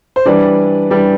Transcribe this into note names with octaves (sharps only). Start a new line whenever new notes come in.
C5
E3 G3 D4 D5
E3 G3 D4